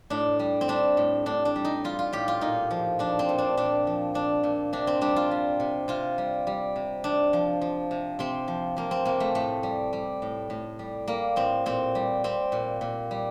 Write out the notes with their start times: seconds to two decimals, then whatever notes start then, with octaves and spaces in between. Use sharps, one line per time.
0.10 A2 D4
0.39 G3
0.61 C4
0.68 G3 D4
0.97 A2
1.26 A2 D4
1.45 D4
1.56 G3
1.65 D#4
1.84 G3 F4
1.99 F4
2.13 A2 G4
2.28 F4
2.41 A#2 D#4
2.71 F3
2.99 F3 D4
3.19 C4
3.29 A#2
3.38 D4
3.57 A#2 D4
3.87 F3
4.14 F3 D4
4.43 A#2
4.73 C3 D4
4.87 C4
5.01 G3 D4
5.16 F4
5.31 G3
5.60 C3
5.88 C3 F4
6.18 G3
6.47 G3
6.76 C3
7.04 C3 D4
7.33 F3
7.61 F3
7.91 C3
8.19 C3 C4
8.48 F3
8.77 F3 A#3
8.91 C4
9.05 C3 A#3
9.20 A3
9.35 A2 A3
9.63 G3
9.93 G3
10.22 A2
10.50 A2
10.79 G3
11.08 G3 A#3
11.36 A2 C4
11.66 A#2 C4
11.95 G3
12.24 G3 C4
12.52 A#2
12.81 A#2
13.11 G3